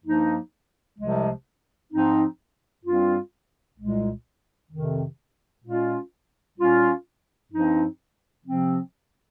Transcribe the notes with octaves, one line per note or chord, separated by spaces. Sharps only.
G2 F3 A#3 D#4
C2 C3 F3 G#3
G#2 F3 C4 D#4
G2 G3 C4 F4
C2 A#2 G#3
F2 C3 D#3
A#2 G#3 C#4 F4
A#2 G3 C#4 F4
G2 F3 C4 D#4
C3 F3 C4